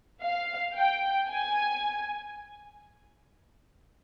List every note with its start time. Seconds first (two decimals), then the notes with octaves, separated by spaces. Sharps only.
0.22 F5
0.75 G5
1.28 G#5